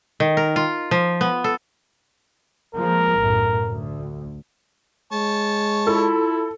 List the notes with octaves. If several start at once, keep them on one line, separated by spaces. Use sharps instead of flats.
D#3
A#4
F4
F3
B3
A4
F3 G#3 A#3 A#4
B1 F#2 A2
D2
G#3 C#5 A5
E4 F4 A4